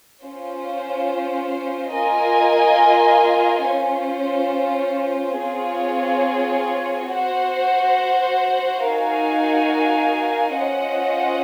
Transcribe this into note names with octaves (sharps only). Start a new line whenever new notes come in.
C#4 F4 C5
F4 A#4 D#5 G#5
C#4 F4 C5
C4 F4 G#4 C#5
F#4 C5 F#5
D#4 F#4 A#4 F5 G#5
C#4 F4 C5 D#5 F#5